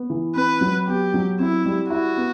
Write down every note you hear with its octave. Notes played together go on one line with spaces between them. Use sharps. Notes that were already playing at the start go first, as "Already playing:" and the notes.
Already playing: B3
E3
C4 B4
F#3
B3 G4
F#3
C4 E4
G3
E4 F#4
B3